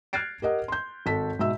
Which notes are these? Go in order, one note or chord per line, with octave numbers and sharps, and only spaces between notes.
F6 F#6 G#6 A6 C7 D7
G4 A#4 D#5 F#5
C6 G6
G#1 A4 B6
G#2 B2 E5 E6